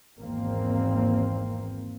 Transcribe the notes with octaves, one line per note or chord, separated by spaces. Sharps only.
G#1 E2 A#3 C4